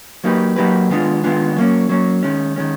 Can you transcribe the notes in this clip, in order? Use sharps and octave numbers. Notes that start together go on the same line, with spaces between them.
F#3 A#3 D#4 G4 B4
F#3 A#3 D#4 G4 B4
D#3 G#3 B3 D4 F4
D#3 G#3 B3 D4 F4
F#3 A#3 C#4
F#3 A#3 C#4
D#3 G#3 C#4
D#3 G#3 C#4